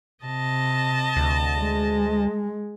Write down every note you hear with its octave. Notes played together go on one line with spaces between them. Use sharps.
C3 D#5 A5
D2
G#3